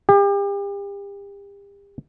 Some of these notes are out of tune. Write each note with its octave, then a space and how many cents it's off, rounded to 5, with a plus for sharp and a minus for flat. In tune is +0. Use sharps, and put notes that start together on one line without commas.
G4 +35